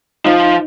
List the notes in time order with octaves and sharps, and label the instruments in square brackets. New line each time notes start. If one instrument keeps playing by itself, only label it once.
[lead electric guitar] F3 [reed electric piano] D#4